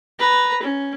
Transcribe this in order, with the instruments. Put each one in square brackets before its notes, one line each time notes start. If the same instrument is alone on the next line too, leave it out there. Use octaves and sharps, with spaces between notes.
[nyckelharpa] B4 A#5
C#4